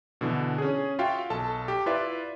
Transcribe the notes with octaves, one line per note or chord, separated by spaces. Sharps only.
B2 D3 E3
C#4 G#4
F4 F#4 E5 F5 G5
B1 A4 A5
G4
E4 F4 B4 D5 E5